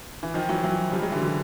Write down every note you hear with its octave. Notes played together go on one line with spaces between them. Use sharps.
E3
D#3 F3
E3 F#3
E3 F#3
F3 G3
F#3 G#3
D3 E3
D3